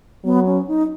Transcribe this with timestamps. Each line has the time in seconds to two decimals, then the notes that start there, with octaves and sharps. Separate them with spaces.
0.24 F#3 B3
0.46 C#4
0.67 D#4